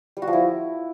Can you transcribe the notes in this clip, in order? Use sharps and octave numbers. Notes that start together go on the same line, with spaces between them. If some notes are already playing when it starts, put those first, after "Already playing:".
G3
F#4
F3
E4